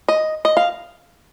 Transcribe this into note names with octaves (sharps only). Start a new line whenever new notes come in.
D#5
D#5
F5